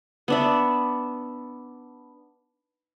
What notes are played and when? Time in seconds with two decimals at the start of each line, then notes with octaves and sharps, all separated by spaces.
0.28 B3 D4 E5